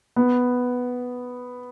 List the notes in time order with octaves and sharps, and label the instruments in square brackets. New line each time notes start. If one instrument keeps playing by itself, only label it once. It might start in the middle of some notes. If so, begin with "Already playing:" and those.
[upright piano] B3